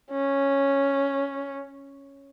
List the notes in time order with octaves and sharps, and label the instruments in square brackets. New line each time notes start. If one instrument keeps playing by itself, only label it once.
[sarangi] C#4